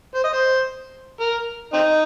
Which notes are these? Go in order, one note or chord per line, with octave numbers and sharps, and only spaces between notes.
C5
D#5
C5
A#4
C4 D#4